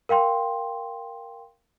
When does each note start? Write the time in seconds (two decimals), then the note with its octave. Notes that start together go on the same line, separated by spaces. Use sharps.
0.09 A#4 F5 G5 C6